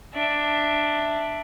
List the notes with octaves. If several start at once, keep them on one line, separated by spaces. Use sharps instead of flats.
D4 E5